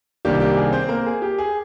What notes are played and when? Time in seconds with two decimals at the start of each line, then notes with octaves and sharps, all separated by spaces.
0.25 C2 C3 D#3 A#3 D4 G4
0.40 G4
0.57 G#4
0.73 C4 C5
0.89 A#3 A#4
1.06 G#4
1.22 G4
1.38 G#4